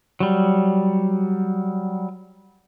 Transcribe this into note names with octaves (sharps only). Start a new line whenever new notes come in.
F#3 G3